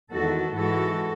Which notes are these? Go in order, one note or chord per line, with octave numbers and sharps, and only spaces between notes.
E2 D#3 G#3 F#4 A4
G#2 E3 G#3 F#4 A4